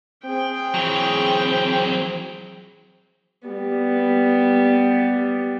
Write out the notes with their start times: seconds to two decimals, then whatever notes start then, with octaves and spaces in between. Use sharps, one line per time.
0.25 C4 G#4 G5
0.74 E3 F#3
3.48 G3 B3